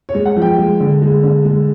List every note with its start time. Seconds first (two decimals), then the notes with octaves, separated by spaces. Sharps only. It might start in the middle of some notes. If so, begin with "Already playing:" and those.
0.09 C#5
0.15 G#3
0.25 F#5
0.36 F3
0.42 G5
0.58 G#3
0.80 D3
1.02 G#3
1.23 D3
1.45 G#3